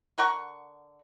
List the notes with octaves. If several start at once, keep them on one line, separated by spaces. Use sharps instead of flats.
D3 A#4 F#5 C#6